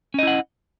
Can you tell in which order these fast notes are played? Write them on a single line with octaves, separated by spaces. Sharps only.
C#4 D#5 E4 F#5